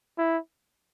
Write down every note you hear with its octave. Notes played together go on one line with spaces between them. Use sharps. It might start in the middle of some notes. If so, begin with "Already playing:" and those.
E4